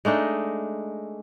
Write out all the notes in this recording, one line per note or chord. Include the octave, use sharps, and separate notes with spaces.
G#3 A3 D4 D#4